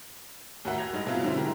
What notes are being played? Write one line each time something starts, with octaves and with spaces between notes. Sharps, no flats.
D#2 A2 F#4 A#4 E5 F#5
G#6 A#6 F7
G2 G#3 D#4 F7
B2 F#3 C4 E4 F4
G#2 D3 C4 E4
G#3 E4 G4 A#4